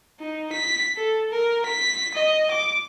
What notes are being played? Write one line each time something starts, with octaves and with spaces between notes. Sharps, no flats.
D#4
B6
A4
A#4
B6
D#5
D6